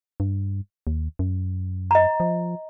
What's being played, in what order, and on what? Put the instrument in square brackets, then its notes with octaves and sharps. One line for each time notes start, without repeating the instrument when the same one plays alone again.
[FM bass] G2
D#2
F#2
[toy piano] D#5 A#5
[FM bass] F3